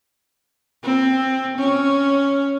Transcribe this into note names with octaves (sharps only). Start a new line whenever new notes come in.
C4
C#4